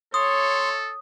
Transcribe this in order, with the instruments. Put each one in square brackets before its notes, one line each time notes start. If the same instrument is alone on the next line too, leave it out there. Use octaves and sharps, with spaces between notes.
[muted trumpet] A4 [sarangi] C#5 [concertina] C6 [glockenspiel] D#6